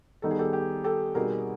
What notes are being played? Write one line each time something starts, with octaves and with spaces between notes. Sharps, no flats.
D#3 G3 B3 D#4 A4
G#4
G4 A4
G4
G4 A4
B2 G3 C4 D#4 G#4 A#4